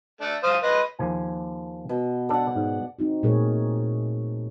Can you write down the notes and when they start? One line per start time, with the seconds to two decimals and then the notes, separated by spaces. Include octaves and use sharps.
0.21 A3 D4
0.44 C5 F5 D#6
0.63 B4 D#5 C6
0.99 D#2 F3 G#5
1.89 B2
2.29 D4 A4 D5 F#5
2.55 G#2
2.99 C4 D#4 F#4
3.23 A#2 A3 G#4 A#4 C#5